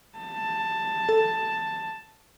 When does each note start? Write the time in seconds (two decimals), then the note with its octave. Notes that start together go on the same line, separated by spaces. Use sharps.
0.18 A5
1.09 A4